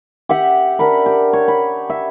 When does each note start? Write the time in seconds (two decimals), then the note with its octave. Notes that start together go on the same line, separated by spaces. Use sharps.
0.29 G4 E5 F#5
0.79 D4 A#4 B5
1.06 G4
1.33 C#5
1.48 B5
1.90 E5